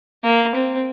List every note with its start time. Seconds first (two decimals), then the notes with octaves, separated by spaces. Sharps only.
0.23 A#3
0.55 C4